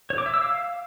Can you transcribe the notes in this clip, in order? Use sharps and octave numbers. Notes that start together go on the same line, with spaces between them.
C#5
D6
E5
E6
F5